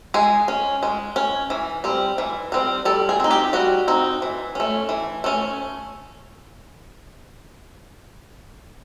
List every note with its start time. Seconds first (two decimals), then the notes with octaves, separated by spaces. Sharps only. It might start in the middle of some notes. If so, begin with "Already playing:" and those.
0.14 G#3 G#4
0.48 C#4
0.83 G#3
1.16 C#4
1.50 E3
1.84 G3 C4
2.18 E3
2.52 G3 C4
2.85 G3 A4
3.09 G#4
3.20 C4 D#4
3.31 G4
3.53 G3 F#4
3.88 C4 D#4
4.22 E3
4.55 A3 C#4
4.89 E3
5.24 A3 C#4